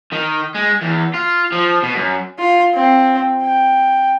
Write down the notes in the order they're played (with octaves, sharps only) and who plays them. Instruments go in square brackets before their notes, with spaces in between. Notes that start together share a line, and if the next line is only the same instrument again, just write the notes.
[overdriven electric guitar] D#3
G#3
E2
F4
F3
B2
F#2
[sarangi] F4
C4
G5